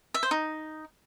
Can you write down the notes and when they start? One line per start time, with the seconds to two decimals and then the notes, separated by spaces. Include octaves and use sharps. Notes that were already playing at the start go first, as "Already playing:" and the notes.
0.14 E5
0.23 C5
0.31 D#4